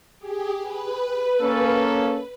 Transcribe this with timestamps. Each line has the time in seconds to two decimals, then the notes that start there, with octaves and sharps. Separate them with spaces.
0.19 G4 G#4
0.61 B4
1.41 A#3 C#4 A4